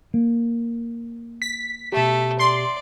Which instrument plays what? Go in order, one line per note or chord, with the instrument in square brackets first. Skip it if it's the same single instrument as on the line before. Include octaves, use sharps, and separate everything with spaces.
[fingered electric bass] A#3
[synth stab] B6
[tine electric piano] B2 G4 [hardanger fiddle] A3 A4
[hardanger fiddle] D5 [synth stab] C6